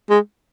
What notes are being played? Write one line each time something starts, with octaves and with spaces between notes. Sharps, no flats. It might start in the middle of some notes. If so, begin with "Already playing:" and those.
G#3